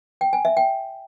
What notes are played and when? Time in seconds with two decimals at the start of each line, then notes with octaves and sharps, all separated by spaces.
0.21 G5
0.33 G#5
0.45 E5
0.57 G5